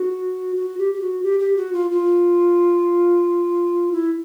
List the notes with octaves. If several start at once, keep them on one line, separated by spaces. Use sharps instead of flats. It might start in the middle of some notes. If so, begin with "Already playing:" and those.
Already playing: F#4
F#4
G4
G4
F#4
G4
G4
F#4
F4
F4
E4